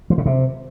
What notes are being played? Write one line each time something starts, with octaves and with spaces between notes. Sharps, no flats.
F3
C#3
C3